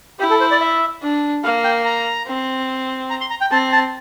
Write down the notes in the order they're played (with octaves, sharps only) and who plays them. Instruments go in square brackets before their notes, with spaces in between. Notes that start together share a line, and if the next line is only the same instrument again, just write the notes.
[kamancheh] E4 [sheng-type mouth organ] G4
[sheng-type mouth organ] A4
C5
D5
E5
[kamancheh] D4
[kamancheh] A#3 [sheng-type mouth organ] F5
[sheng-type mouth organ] G5
A#5
[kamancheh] C4
[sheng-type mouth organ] A#5
C6
A#5
G5
[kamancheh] C4 [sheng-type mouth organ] A5
[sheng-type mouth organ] A5